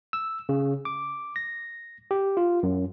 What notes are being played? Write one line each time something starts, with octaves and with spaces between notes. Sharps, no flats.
E6
C#3
D6
A#6
G4
F4
F#2